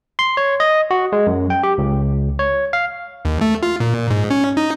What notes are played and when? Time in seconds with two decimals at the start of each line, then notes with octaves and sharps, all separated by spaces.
0.19 C6
0.37 C#5
0.60 D#5
0.91 F#4
1.13 G#3
1.27 F#2
1.50 G5
1.63 G4
1.78 C#2
2.39 C#5
2.73 F5
3.25 D#2
3.41 A3
3.63 F4
3.80 A#2
4.10 G#2
4.30 C#4
4.57 D#4